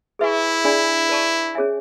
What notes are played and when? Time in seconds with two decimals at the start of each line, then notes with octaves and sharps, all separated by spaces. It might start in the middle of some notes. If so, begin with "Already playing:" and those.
0.19 E4 G#4 B4 E5 G#5 C#6
0.65 D4 G#4 D5 G#5 B5
1.09 B4 D5 A5 C#6
1.55 C#4 G#4 C#5 E5 G#5